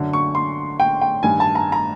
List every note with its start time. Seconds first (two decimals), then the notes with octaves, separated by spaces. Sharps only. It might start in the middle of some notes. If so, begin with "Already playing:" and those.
Already playing: F#2 D3
0.13 C#6
0.35 C6
0.80 G5
1.01 G5
1.23 G2 D#3 G#5
1.40 A5
1.55 A#5
1.72 A#5